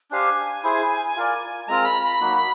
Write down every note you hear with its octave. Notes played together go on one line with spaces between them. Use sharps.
D4 G4 C5 F5 G#5
E4 G#4 C5
F4 A#4 D5
G#3 C4 F4 A#4 A#5
B5
B5
F#3 A#3 D#4 F#4